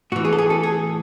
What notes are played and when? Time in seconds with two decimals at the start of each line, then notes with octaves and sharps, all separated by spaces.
0.12 A2 F#4
0.16 E3
0.25 G#4
0.33 A4
0.38 G#4
0.50 A4
0.63 G#4